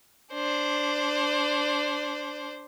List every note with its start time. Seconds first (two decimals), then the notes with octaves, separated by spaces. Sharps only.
0.33 D4 C5